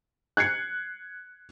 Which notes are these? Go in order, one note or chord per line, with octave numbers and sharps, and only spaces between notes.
F#6 G#6 C7 C#7